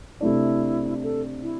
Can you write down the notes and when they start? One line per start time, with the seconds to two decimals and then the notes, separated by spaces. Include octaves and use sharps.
0.21 C3 A3 D4 E4
1.03 A4
1.43 E4